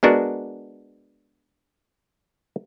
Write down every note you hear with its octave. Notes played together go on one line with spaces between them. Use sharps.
G#3 B3 D4 F#4 A#4